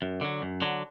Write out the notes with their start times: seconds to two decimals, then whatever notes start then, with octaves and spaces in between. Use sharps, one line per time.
0.02 F#2
0.21 D3 F#3
0.42 F#2
0.62 D3 F#3